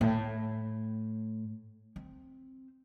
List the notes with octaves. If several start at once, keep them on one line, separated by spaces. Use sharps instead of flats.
A2
C4